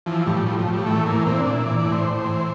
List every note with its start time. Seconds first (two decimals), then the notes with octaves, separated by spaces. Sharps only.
0.06 E3 F3
0.26 A2 G3
0.46 A2 F3
0.59 F3
0.67 A2
0.73 G3
0.86 E3 A3
1.06 E3 A#3
1.26 A#2 C4
1.40 D4
1.46 A#2
1.53 E4
1.66 E3 D5
1.79 D5
1.85 A2
1.92 C5
2.06 A2
2.26 E3